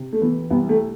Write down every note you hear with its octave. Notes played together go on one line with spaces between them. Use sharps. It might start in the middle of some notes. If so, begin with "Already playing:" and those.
Already playing: C3
A3
E3 B3
C2 B3
A3